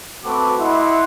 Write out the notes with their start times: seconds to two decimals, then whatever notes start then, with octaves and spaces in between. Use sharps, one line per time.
0.24 A3 C4 F#4 B4 D6
0.58 E4 D#5 E5 F#5 C6